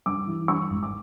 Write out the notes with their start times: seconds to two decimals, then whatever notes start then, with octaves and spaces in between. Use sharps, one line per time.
0.06 G2 D6
0.27 E3
0.48 G2 C#6
0.70 G#1
0.83 D6